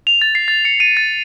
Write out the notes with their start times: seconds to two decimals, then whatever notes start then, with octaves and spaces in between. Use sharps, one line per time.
0.07 F7
0.22 A6
0.35 C7
0.48 A6
0.65 C#7
0.80 D#7
0.97 A6